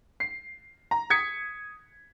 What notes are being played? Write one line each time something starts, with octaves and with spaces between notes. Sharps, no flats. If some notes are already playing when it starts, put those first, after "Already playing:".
C7
A#5
D#6 G#6 B6 C#7